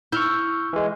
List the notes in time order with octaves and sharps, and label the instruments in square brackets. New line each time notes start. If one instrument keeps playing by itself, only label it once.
[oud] E4 [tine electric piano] C#6 F6 G6
[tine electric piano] E3 G#3